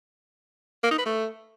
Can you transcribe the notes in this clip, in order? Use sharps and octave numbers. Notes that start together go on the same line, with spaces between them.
A#3
D#4
B4
A3